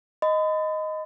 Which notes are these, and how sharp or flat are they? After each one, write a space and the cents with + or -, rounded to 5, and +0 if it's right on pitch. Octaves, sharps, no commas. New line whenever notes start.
D#5 +0 B5 +40